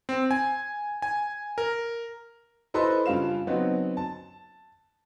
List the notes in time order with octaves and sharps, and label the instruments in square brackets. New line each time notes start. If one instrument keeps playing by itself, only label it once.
[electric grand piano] C4
G#5
G#5
A#4
[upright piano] E4 A4 B4 C5 D#5 C6
G2 C#3 F4 F5 E7
C#3 F#3 B3 C4 D#4
A5